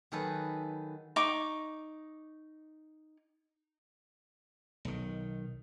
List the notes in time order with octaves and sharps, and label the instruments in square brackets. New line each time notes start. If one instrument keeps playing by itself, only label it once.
[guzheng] D#3 F#3 G#4 A4 B4
[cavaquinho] D#4 C#6 D6
[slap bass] B1 D#3